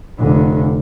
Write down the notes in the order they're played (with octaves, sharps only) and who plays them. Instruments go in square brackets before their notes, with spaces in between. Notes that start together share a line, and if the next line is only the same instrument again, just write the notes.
[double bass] F1 D3